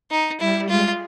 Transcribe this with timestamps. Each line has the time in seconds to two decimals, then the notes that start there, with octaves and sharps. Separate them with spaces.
0.11 D#4
0.40 G3 E4
0.69 G#3 F4